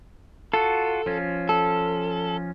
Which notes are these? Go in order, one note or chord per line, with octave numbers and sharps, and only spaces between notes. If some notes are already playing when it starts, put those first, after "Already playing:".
F4 F#4 A4
F3 C#4 F4
A4